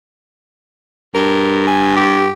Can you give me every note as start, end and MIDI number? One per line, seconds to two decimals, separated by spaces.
1.15 2.29 43
1.15 1.62 70
1.67 1.94 80
1.97 2.30 67